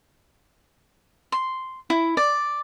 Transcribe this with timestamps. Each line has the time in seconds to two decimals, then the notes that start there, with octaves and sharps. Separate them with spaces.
1.32 C6
1.90 E4
2.17 D5